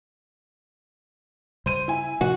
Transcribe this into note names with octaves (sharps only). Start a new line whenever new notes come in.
C#3 G3 C5 D#7
E4 G#5
C3 F3 F#4